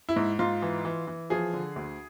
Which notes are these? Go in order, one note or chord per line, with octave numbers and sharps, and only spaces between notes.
E4
G#2
G#2 F4
E3
E3
E3
F3 G#4
D3
D2